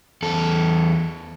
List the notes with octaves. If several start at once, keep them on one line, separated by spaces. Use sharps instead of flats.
E2 A4